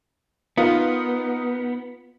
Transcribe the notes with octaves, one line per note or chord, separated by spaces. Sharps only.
B3 D#4 F4 A#4 B4